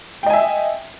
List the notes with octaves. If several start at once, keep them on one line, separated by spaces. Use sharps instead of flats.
D#5 E5 G5 G#5